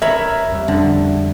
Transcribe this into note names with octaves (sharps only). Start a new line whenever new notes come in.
A#4 C#5 E5 A#5 B5
F2 G3
D3